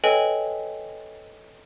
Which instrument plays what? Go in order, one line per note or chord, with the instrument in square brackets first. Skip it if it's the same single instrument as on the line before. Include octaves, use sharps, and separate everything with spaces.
[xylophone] A4 B4 C#5 D#5 G5 G#5